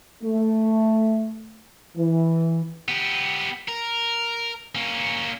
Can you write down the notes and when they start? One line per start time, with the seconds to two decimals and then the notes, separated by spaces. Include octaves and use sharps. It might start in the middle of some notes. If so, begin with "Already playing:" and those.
0.24 A3
1.97 E3
2.88 B3 G4
3.68 A#4
4.75 A#3 C#4